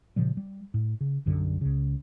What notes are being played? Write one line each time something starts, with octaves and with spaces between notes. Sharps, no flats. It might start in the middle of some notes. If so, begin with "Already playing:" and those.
A#2 C#3 F3 G3
G3
A2
C#3
B1 F#2 D3 G3
C#2 C#3